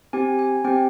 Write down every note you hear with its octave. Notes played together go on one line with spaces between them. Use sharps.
C4 G4 G#5
G#5
C4 G4 G5